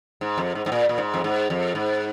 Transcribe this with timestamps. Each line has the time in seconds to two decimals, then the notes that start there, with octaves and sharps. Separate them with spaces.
0.21 G#2
0.38 F2
0.55 G#2
0.66 G#2
0.72 A#2
0.89 A#2
0.98 G#2
1.14 F2
1.24 G#2
1.50 F2
1.75 G#2